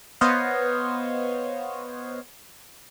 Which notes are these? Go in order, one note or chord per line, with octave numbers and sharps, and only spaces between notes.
B3 C5 C#5 D#5 F5